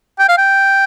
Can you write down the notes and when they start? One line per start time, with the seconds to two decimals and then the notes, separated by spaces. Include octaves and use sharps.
0.19 G5
0.29 F5
0.38 G5